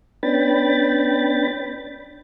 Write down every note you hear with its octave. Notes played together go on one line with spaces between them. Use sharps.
B3 C#4 D4 G5 B5 A6